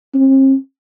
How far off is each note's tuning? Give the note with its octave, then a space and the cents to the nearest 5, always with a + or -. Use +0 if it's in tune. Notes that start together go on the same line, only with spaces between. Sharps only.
C4 +40